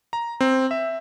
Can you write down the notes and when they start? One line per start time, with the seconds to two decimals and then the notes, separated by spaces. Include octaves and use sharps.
0.13 A#5
0.41 C4
0.71 E5